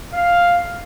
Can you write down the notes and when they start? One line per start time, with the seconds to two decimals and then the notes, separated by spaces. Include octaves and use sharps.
0.13 F5